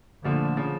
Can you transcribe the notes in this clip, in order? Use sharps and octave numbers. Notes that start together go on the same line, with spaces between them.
A#2 D3 F3 A3
C#3 F3 C#4